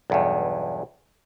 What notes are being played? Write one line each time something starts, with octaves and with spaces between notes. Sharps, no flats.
B1 E2 G2